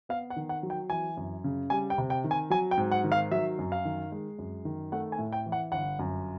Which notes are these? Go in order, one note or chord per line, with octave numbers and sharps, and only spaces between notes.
B3 F5
F#5
D#3
F#5
F#3
G5
E3 G#5
F#2
C#3
G3 G#5
G5
C3
G5
D#3
G#5
F#3 G#5
G5
G#2
F#5
D#3
F5
F#3 E5
F#2
F5
D#3
G#3
F#2
D#3
A3 F#5
G#5
A2
G5
E3
F#5
G1 F#5
F#2